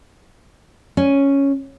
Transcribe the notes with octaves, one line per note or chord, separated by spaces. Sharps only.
C#4